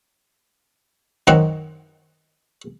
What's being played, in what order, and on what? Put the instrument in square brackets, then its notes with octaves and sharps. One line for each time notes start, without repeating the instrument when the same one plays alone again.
[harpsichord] F#2 D#3 C4 D#4 F#5 A#5